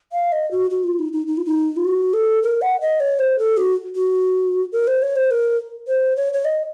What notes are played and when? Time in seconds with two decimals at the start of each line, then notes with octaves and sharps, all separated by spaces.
0.13 F5
0.32 D#5
0.51 F#4
0.70 F#4
0.84 F4
0.99 D#4
1.13 D#4
1.27 D#4
1.37 F4
1.45 D#4
1.77 F4
1.85 F#4
2.13 A4
2.43 A#4
2.62 F#5
2.81 D#5
3.00 C#5
3.19 C5
3.39 A4
3.57 F#4
3.96 F#4
4.72 A#4
4.87 C5
5.02 C#5
5.16 C5
5.31 A#4
5.88 C5
6.16 C#5
6.33 C#5
6.45 D#5